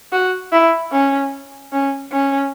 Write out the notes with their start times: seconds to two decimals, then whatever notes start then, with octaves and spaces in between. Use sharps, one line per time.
0.12 F#4
0.52 E4
0.92 C#4
1.72 C#4
2.12 C#4